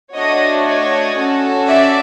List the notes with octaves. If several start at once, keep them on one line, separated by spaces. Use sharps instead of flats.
A3 D4 F#4 C#5 D#5
C#5 D#5
C#4 F#4 A4
D5 E5